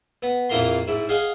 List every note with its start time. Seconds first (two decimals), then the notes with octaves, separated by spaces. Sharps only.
0.22 B3
0.49 A#1 F2 E3 A#3 A#5 C6
0.87 G#2 E4
1.09 G#4 D#5 F5 F#5